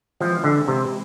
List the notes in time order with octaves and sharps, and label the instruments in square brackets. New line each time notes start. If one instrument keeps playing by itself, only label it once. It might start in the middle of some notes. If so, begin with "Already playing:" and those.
[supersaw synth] E3 G#3 C4 E4 [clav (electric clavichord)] F3
[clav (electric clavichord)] D3
C3